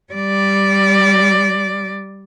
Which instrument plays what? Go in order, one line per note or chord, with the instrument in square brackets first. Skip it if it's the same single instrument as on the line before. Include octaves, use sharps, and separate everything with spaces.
[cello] G3 D5